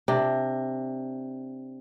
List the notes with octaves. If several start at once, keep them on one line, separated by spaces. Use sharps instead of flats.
C3 D4